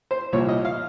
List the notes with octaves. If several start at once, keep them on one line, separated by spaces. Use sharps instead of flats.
C5
C2 A#2 F3 C#5
D#5
F5